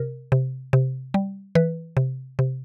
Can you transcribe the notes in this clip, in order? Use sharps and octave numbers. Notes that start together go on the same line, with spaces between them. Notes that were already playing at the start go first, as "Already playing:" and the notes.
Already playing: C3 A#4
C3
C3
G3
E3 B4
C3
C3